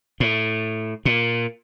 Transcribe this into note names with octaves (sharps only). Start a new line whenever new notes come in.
A2
A#2